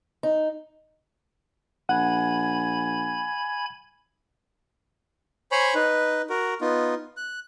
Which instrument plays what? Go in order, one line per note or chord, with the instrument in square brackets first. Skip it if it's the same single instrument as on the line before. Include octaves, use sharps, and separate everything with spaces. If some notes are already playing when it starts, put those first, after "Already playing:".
[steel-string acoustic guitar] D#4
[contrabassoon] A#1 [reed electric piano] F#5 [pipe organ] G#5 B5 G#6
[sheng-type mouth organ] C5 C#5 G#5 B5 C#6
D#4 B4
F#4 A#4
B3 D#4 F4
F#6